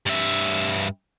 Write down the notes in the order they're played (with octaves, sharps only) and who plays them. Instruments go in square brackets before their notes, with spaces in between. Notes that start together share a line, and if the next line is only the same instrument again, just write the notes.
[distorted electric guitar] G2 E5